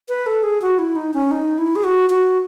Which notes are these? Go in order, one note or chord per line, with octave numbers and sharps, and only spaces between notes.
B4
A4
G#4
F#4
E4
D#4
C#4
D#4
E4
G#4
F#4
F#4